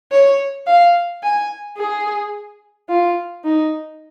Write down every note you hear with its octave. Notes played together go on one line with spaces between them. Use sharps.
C#5
F5
G#5
G#4
F4
D#4